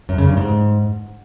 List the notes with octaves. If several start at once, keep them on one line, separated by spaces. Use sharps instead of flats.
F#2
C#3
G2
G#2